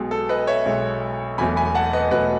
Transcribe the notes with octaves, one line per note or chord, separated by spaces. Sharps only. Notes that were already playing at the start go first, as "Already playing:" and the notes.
Already playing: B1 B2 G#3
A4
B4 D#5
C#5 E5
B1 B2 G#3
E1 E2 B2 F#3 A3 G#5 B5
G#5 B5
F#5 A5
B4 D#5
E1 E2 B2 F#3 A3 B4 D#5